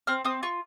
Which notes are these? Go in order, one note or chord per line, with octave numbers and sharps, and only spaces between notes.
C4 F6
C4 D#6
F4 C#6